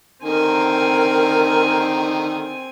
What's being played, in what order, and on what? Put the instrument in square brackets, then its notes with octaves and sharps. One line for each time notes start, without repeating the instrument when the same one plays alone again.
[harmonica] D3 D#3 [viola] C4 G#5 [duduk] A#4